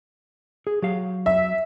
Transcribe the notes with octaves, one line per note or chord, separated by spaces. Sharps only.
G#4
F#3 G4 F5
E5